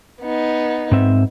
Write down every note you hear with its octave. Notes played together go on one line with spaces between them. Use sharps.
B3 D#4
G#2 C4 E5